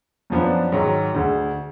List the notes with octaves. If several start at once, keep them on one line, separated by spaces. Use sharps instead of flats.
F#2 F3 B3 D4
G#2 D#3 F#3
D2 D3 G#3